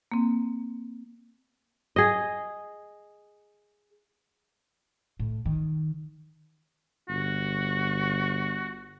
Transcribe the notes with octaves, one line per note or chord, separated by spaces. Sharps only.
A#3 C4
G#4 D#5
A2
D#3
G1 F#4